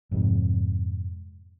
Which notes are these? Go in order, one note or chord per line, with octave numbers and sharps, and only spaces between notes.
F2 G#2 C3